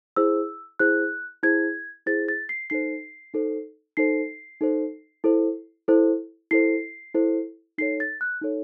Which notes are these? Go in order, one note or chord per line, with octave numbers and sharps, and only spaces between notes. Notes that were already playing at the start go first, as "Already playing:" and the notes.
E4 G#4 C5 E6
E4 G#4 C5 F#6
E4 G#4 C5 G#6
E4 G#4 C5 A6
A6
C7
D#4 A4 C5 C7
D#4 A4 C5
D#4 A4 C5 C7
D#4 A4 C5
E4 A4 C5
E4 A4 C5
E4 A4 C5 C7
E4 A4 C5
D#4 A4 C#5 C7
A6
F#6
D#4 A4 C#5